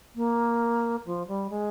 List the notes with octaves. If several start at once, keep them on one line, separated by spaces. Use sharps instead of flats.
A#3
F3
G3
G#3